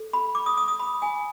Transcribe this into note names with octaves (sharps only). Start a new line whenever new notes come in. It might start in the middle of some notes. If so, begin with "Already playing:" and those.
Already playing: A4
B5
D6
D#6
D#6
D#6
B5
G#5